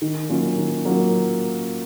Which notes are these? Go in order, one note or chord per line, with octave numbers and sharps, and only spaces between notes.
D#3
F#3 A#3 C#4 F4
D#3
F#3 A#3 C#4 F4